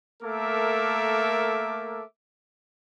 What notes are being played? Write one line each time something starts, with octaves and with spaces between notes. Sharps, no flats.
A3 A#3 A4 A#4 E5 D6